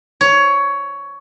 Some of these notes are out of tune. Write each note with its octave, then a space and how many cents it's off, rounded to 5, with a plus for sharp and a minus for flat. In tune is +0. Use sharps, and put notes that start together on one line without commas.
C#5 +15